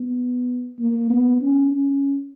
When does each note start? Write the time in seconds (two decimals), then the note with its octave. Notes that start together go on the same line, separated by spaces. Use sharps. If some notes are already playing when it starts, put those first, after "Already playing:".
Already playing: B3
0.79 A#3
1.10 B3
1.42 C#4
1.72 C#4